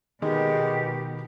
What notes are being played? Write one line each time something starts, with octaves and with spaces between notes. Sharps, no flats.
B2 D#3 G#3 G4